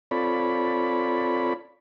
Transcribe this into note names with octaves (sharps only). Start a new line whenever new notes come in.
C4 F4 A4 C#5 D5 B5